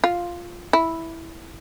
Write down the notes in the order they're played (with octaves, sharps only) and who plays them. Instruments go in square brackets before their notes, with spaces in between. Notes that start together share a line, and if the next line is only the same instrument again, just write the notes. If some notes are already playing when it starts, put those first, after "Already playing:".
[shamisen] F4
E4